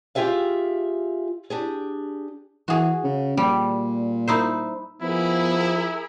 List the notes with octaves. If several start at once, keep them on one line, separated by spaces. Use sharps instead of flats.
F4 G4 G#4 E5 F5
D4 G4 G#4
E3 F#4 G#4
C#3
A#2 G3
D#4 E4 C5
F3 B3 E4 G#4 A#4 B5